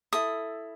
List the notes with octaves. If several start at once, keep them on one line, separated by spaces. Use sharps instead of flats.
E4 A4 D#6